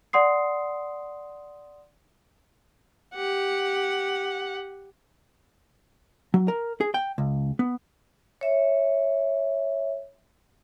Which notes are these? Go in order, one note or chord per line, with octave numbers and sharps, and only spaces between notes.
D5 F#5 C6 D#6 C7
G4 F#5
F#3
A#4
G#4
G5
C#2
B3
C#5 E5